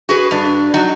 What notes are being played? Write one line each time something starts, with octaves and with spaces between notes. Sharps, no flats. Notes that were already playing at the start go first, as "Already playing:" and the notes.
F#4 G#4 B4
G2 D4
F#3 D#4 F#4